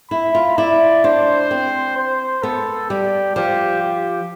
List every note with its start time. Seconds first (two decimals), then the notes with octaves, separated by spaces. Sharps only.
0.11 E4 B5
0.35 F4
0.58 E4 D5
1.04 D4 C5
1.51 C4
1.97 C5
2.43 B3 A4
2.90 G3 G4
3.36 F3 G4
3.82 G4